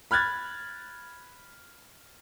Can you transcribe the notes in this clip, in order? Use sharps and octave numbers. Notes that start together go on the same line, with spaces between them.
B5 F6 F#6 G#6 A6